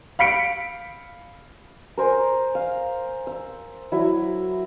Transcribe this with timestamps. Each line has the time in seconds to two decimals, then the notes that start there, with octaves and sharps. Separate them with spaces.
0.19 F5 B5 B6 C#7 D7
1.97 A#4 C5 G#5 A#5
2.55 F5
3.27 E6
3.92 F#3 E4